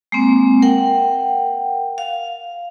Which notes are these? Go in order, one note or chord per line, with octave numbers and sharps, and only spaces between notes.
G#3 A#3 C4
A#4 F#5 G5
F5